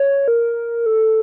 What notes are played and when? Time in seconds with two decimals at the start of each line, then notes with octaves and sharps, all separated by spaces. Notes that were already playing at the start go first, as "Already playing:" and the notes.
Already playing: C#5
0.28 A#4
0.86 A4